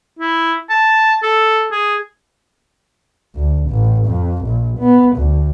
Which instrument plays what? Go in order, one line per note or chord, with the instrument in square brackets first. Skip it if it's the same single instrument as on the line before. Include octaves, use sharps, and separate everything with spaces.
[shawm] E4
A5
A4
G#4
[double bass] D2
A1
F2
A#1
B3
D2